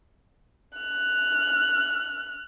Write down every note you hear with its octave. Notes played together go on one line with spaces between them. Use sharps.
F6 F#6